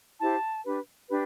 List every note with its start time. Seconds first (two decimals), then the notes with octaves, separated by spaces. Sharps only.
0.20 E4 G4 C5 A5
0.64 D4 G4 B4
1.09 D4 G4 B4